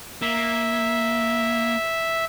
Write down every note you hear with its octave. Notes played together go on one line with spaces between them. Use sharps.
A#3 E5